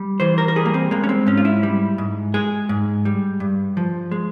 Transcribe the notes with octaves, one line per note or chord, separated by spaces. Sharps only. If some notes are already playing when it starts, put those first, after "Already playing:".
Already playing: G3
E3 C5
A#4
A#4
G3 G#4
A#3
C4
G#3 A#3
C#4
C4
G#2 C#4
F4
E4
G3
G#2
G#3 G#4
G#2
G3
G2
F3
G#3